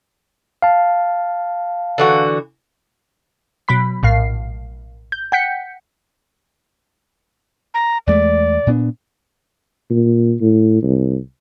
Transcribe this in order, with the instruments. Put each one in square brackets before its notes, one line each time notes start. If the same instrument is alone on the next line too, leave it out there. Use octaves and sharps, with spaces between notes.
[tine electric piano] F5 A5
[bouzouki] D3 E3 F#4
[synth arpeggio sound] B2 F#3 B5 B6
A#1 A2 F5 C7
G6
F#5 G5 G6 B6 C#7
[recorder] A#5
[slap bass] E2 G#3 A3 [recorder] D5
[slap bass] A#2 B3 D4
[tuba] A#2
A2
C2